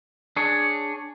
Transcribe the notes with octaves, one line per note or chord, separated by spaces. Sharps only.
D4 G#4 C#5